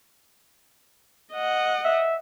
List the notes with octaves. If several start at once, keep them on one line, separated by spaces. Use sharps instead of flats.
D#5 F#5
E5